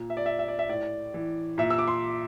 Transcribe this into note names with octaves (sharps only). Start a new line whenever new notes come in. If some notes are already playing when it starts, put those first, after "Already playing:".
Already playing: A#2
E5
D5
E5
E5
D5
E5
A2 D5
E3
A#2 E5
E6
D6
C6